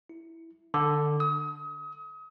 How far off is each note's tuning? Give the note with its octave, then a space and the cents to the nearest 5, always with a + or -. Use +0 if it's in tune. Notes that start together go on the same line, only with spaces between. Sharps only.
E4 -5
D3 +20
D#6 +35